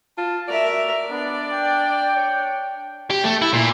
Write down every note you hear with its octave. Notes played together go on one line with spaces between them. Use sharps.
F4 A5
F#4 A#4 D5 E5
B3 D4
G5
C#5
G4
A3
E4
A#2